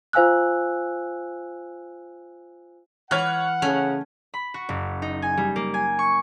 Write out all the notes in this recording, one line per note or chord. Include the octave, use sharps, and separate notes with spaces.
F4 C5 F5 G#5 E6 F#6
E3 C#5 F#5 F6 F#6
C#3 A3 C#4 F7
B5
F#4
F#1
D#4
G#5
G3
A#3
G#5
C#6